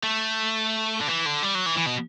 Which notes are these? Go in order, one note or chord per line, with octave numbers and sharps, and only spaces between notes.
A3
D3
E3
D3
G3
F#3
E3
E3
B2